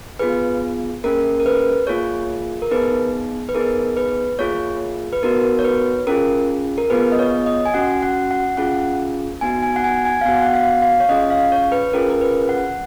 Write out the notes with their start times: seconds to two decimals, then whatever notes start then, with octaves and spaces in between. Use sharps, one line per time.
0.19 B3 F4 G#4 B4
1.04 A#3 C#4 G#4 A#4
1.40 A#4
1.46 B4
1.87 A#3 F4 G#4 C#5
2.62 A#4
2.71 B3 D#4 G#4 B4
3.49 B4
3.55 B3 D#4 G#4 A#4
3.97 B4
4.39 A#3 F4 G#4 C#5
5.13 B4
5.23 B3 D#4 F#4 A#4
5.44 A#4
5.59 C#5
5.64 B4
6.07 C#4 F4 G#4 A#4
6.78 A#4
6.90 B3 F4 G#4 B4
7.12 D#5
7.19 C#5
7.46 D#5
7.65 G#5
7.74 C#4 F#4 F#5
8.03 F#5
8.31 F#5
8.57 C#4 F4 G#4 F#5
9.41 B3 D#4 F#4 G#5
9.63 G#5
9.76 F#5
9.84 G#5
10.05 G#5
10.21 F5
10.25 B3 F#4 F#5
10.42 F#5
10.54 F5
10.82 F5
11.00 C#5
11.09 C#4 F4 G#4 D#5
11.30 F5
11.52 C#5
11.72 B4
11.93 C#4 F4 G#4 A#4
12.10 A#4
12.21 B4
12.49 F#5